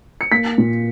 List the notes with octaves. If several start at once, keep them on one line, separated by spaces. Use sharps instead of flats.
C#7
A#3 B6
A#2